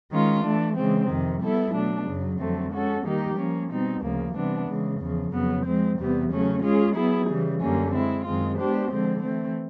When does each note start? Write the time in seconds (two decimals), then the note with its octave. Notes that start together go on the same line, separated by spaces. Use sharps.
0.11 D#3 G#3 C#4 F4
0.43 E3 A3 D4
0.77 C#3 E3 G#3 C4
1.08 F2 C3 D#3
1.42 G3 B3 E4 A4
1.74 B2 F#3 A3 D4
2.06 F#2 C#3 F#3
2.39 F2 D3 F#3 A3 C4
2.72 G#3 C#4 F#4 A4
3.04 D#3 G3 A#3 D#4 G4
3.36 F3 A#3 C#4
3.70 B2 G3 C4 D#4
4.02 D2 C#3 F3 A#3
4.35 C3 E3 G3 B3 D4
4.67 C#3 E3 G#3
5.00 E2 C#3 F3
5.32 F2 C#3 F#3 B3
5.65 F3 G#3 C4
5.98 E2 C3 E3 G3 B3
6.30 C#3 F#3 A3 C#4
6.63 G#3 C#4 F4 G#4
6.95 F#3 B3 E4 G#4
7.29 C#3 E3 G3
7.60 F#2 D3 G3 A#3 C#4
7.93 G#3 C4 E4
8.25 F#2 D#3 G#3 C4 F4
8.58 G#3 B3 D4 G4 C5
8.91 D3 F3 G#3 C4
9.23 E3 A3 C4